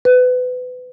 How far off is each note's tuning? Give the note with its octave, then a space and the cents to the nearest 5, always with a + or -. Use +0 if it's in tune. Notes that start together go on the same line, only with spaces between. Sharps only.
B4 +30